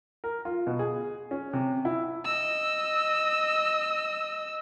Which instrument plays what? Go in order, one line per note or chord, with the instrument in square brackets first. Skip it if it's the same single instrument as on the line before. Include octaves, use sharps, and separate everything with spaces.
[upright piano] A#4
F4
B2
G#4
C#4
C3
E4
[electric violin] D#5 E6